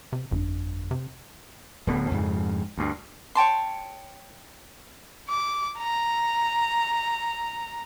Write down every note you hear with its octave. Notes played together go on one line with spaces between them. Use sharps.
C3
G1 F2 C4 D4
C3
D1 D3 B3
F2 G#2 C#3
D2 G2
C#5 G5 A5 C6
D6
A#5